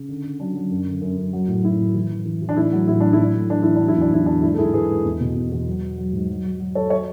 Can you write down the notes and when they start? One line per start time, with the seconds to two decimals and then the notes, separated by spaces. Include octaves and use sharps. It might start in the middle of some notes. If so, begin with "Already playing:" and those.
Already playing: C#3
0.08 D3
0.24 D3
0.40 F#3 D4
0.55 F#3
0.70 F#2
0.87 D3
1.01 F#2
1.17 F#2
1.33 F#3
1.48 A2
1.63 F#3 E4
1.79 A2
1.94 E3
2.10 E3
2.25 E3
2.42 E3
2.49 D4
2.56 A2 E4
2.73 F#3
2.88 A2 E4
3.00 F#3 D4
3.13 E4
3.18 A2
3.34 A2
3.50 E3 D4
3.62 E3 E4
3.76 F#3 D4
3.88 E4
3.97 E2 D4
4.12 E2 E4
4.26 D3 D4
4.42 G#2 E4
4.54 A4
4.58 G#2 E4 G#4
4.73 G#2 G#4 B4
4.89 G#2
5.05 E2
5.21 B2
5.36 E2
5.52 E2
5.67 F#3
5.82 F#3
5.98 F#3
6.13 G#2
6.29 F#3
6.45 F#3
6.60 F#3
6.75 F#3 A4 C#5
6.90 F#3 C#5 E5